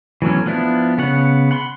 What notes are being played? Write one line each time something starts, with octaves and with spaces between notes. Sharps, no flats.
E3 F#3 A3 B3 C#4
F3 B3 D4 E4
C#3 B3 C#5 F#5
F#5 B5 C6